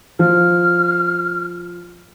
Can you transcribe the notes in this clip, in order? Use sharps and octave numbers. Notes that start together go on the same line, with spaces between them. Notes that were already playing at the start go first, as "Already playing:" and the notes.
F3 F6